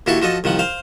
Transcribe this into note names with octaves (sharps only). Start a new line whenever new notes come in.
D#2 A#2 E4 F#4 A4 C#6
F3 F#4 A4 D#5
C2 D#3 F3 F#5
C5 F5